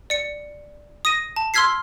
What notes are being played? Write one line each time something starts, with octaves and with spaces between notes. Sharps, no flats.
D5 C#7
D#6 A#6 D#7
A5
C6 E6 F6 G#6 B6 C7